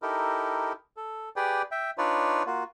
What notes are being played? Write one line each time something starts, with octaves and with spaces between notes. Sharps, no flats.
D#4 E4 G4 A4 A#4
A4
G4 G#4 B4 D5 G5
E5 G5
D4 D#4 F4 B4 C#5 D5
A#3 F4 F#4